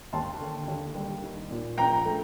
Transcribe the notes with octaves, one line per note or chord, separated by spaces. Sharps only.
D#2 A5 C6
D3
D#2
G3
D#4
A#2
A#1 G5 A#5
A3